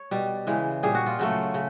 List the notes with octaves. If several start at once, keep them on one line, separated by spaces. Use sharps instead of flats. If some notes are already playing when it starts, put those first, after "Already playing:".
Already playing: C#5
B2 G3
C#3 E3 G#3
A#2 G3 G#4
F#4
F4
C#3 F#3 A3
C#3